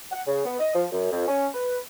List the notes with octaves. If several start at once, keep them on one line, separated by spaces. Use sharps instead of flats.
F#5
C#3
B3
D#5
F3
F#2
F2
C#4
B4